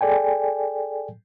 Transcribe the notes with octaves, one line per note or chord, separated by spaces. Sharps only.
G#4 A4 D5 G5 G#5